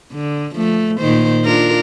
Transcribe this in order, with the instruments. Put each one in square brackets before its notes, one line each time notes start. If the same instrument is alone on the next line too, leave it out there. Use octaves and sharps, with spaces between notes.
[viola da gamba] D3
F3 A3
A#2 D#3 C5
D4 F4 A#4